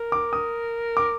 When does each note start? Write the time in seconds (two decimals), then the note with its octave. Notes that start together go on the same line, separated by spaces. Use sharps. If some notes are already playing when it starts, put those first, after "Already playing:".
Already playing: A#4
0.12 D6
0.33 D#6
0.97 D6